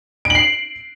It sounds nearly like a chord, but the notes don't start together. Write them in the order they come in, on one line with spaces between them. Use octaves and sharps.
D7 F#7 C7